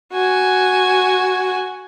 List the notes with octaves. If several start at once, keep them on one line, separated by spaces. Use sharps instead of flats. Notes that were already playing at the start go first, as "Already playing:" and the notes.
F#4 G#5